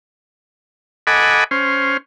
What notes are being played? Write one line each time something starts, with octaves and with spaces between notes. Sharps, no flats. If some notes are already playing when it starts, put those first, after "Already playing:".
A4 D#5 F#5 G#5 B5 D6
C#4 C5 F6